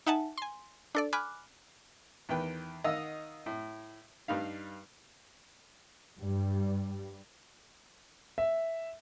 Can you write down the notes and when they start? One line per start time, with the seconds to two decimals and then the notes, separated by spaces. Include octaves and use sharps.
0.06 D#4 E5 F#5 G#5 A5
0.37 G#5 C6
0.95 D4 A4 D5
1.13 G#5 B5 D6 F6 F#6
2.29 E2 D#3 B4 G5
2.84 D#3 D#5 F5 F#5 E6
3.46 A2
4.28 G2 G3 D#4 F5
6.20 G2 G3
8.38 E5